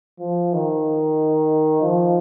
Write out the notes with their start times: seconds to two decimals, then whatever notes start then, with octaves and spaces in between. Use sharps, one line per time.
0.20 F3
0.53 D#3
1.82 F3